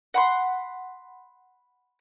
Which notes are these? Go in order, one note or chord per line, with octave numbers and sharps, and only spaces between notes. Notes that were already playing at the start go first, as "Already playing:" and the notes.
F#5 B5 C6